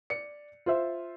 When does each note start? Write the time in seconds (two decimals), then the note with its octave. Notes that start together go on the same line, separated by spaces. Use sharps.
0.10 D5 C#7
0.66 F4 C5 E5